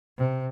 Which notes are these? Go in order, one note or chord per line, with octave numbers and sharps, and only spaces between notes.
C3